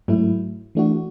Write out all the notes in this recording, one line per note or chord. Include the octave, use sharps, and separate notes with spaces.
G#2 F#3 A3 E4
E3 A3 D4 F#4